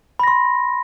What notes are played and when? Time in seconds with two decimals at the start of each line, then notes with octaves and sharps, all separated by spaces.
0.19 B5
0.23 A#6
0.28 C6